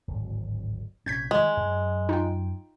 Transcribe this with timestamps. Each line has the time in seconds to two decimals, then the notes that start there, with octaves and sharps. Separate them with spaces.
0.08 D1 G#1
1.06 A#1 C3 C#4 G6 G#6 B6
1.31 D#3 F3 G3 G#3
1.57 F#2
2.09 D#4 F4 G5